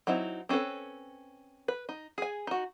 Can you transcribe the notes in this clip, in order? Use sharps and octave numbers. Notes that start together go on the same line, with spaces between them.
F#3 C4 D#4 E4
C4 C#4 F#4 A4 B4
B4
D#4
G#4 G#5
D#4 F#4